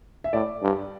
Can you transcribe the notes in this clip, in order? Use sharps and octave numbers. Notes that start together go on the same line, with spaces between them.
E5
A2 D5
G2